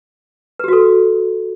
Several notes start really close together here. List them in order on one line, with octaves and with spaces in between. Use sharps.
B4 G4 F#4 A4